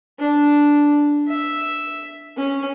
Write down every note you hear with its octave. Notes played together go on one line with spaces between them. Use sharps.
D4
E5
C#4